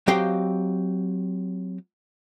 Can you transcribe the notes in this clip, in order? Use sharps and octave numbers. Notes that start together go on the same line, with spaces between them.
F#3 C4 G4 D#5 F5 G5